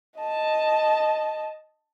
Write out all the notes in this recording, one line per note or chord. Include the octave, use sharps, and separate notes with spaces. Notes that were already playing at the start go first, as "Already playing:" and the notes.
D#5 A5